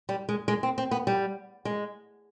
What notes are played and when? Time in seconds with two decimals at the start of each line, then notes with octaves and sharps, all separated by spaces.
0.09 G3
0.29 G#3
0.48 G#3
0.63 C4
0.78 C4
0.91 B3
1.07 G3
1.65 G#3